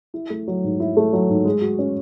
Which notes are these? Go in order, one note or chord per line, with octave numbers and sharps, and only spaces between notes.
E4
A3
F#3
G#2
E4
A3
F#3
G#2
G#3
F#4
C#4